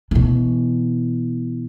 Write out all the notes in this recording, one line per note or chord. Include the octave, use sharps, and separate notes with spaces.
B2 E3